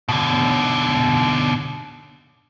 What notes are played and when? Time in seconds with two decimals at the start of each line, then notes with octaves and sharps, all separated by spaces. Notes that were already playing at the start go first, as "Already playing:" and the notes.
0.09 B2 D3